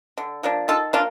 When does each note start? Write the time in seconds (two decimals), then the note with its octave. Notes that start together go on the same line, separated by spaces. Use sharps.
0.18 D3
0.43 F3 A#3 D4
0.68 D#3 F4 A4
0.93 A#3 D4 F4